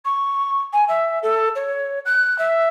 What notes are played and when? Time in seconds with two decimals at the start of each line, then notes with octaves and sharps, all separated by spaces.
0.04 C#6
0.72 G#5
0.88 E5
1.22 A4
1.55 C#5
2.05 F#6
2.38 E5